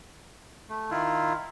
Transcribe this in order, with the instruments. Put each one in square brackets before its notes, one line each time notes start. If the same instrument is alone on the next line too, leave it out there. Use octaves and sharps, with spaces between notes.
[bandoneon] A3
D#3 E4 F4